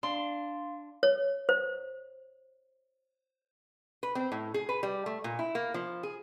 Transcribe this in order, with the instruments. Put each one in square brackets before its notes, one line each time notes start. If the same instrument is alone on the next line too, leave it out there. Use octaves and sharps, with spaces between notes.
[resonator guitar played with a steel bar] D4 [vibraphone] F5 [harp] C6
[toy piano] C#5
C5
[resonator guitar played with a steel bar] B4
C4
A2
G#4
B4
G3
A3
A#2
E4
A#3
F3
G#4